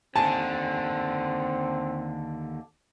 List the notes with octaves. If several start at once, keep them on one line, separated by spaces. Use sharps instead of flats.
D#2 D3 C4 G#5 A5